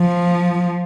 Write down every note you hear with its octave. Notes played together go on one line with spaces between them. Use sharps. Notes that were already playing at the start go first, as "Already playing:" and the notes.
Already playing: F3